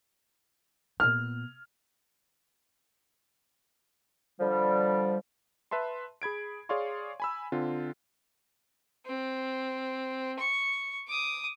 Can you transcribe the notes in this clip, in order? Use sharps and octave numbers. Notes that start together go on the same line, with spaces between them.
A#2 B3 F6
D3 F3 G3
B4 E5 A5 C6
G#4 B5 G#6 D7
G#4 C#5 D5 F5 C6 C#6
G#5 B5 E6
D3 C4 F4
C4
C#6
D6 D#6